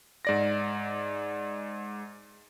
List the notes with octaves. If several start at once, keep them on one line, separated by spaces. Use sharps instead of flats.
G#2 D5 A#6